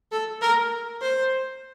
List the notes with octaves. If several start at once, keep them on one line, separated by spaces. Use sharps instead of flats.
A4
A#4
C5